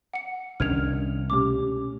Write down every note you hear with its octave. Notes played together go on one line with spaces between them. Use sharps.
F#5 C#7
C2 D#3 C#4 D4 F6 G#6 F7
B2 A3 C#4 G4 D6